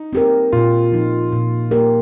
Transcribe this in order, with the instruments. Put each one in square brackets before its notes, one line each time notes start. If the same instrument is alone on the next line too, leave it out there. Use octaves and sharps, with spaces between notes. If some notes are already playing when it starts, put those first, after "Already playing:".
Already playing: [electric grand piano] D#4
[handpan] C4 G4 A#4
[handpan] A#2 [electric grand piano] F4
[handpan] F3 D#4
A#2
A#3 G4 A#4